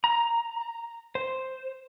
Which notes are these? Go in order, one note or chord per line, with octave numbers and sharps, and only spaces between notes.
A#5
C5